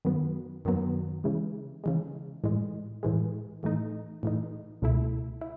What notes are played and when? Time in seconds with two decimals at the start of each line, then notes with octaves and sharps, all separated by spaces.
0.05 F#2 D#3 F#3 B3
0.65 F#2 D#3 F#3 B3
1.24 C#3 E3 G#3
1.84 C#3 E3 G#3
2.44 A2 E3 G#3
3.03 A2 E3 G#3
3.63 A2 E3 A3 D#4
4.23 A2 E3 A3 D#4
4.82 C#2 B2 A3 E4
5.41 E4